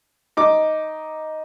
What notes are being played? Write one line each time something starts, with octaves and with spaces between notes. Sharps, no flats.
D#4 D6